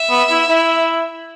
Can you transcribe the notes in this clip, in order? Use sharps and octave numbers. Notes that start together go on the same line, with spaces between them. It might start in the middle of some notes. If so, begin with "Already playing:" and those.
Already playing: E5
B3
E4
E4